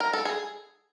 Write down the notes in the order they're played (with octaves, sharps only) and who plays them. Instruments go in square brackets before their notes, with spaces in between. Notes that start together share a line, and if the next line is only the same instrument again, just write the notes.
[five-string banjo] A#4
A4
G#4